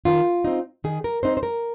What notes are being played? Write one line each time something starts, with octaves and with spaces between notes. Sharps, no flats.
D#3 F4
C4 D#4
D#3 G#4
A#4
C4 D#4 C5
C5
A#4